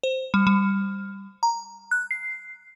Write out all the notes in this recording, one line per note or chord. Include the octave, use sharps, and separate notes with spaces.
C5
G3
G3
A#5
F#6
C7